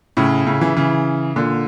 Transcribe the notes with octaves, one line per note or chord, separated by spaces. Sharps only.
A2 C#3
A2 C#3
C#3 E3
C#3 E3
A#2 D3